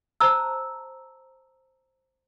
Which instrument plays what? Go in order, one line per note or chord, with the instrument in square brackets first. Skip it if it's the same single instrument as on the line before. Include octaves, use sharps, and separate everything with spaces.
[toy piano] C5 A5 A#5 E6